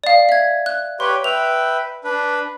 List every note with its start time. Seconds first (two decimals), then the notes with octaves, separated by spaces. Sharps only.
0.04 D5 F5
0.29 E5 G#6
0.66 F#6
1.00 G4 B4 C#5 C6
1.24 B4 E5 G5 F7
2.04 D4 B4